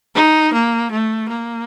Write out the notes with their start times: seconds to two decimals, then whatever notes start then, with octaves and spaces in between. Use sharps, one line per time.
0.15 D#4
0.53 A#3
0.91 A3
1.29 A#3